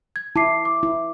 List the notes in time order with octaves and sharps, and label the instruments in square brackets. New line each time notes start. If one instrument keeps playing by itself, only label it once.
[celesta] G#6
[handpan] E4 [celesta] A5 D6 C7
[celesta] D6
[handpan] E4